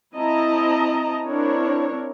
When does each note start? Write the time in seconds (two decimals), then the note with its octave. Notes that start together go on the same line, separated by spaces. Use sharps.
0.16 C4 E4 D#5 A5 A#5
1.26 C4 D4 E4 A#4 C#5